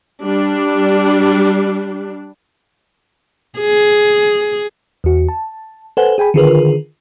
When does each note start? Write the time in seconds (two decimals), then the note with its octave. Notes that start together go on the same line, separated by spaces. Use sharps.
0.22 G3 D4
3.59 G#4
5.04 E2 F#4
5.29 A5
5.97 A4 B4 C5 F#5 G#5
6.18 G#4 G5 G#5 B5
6.34 D3 D#3 F4 G#4 A#4 B4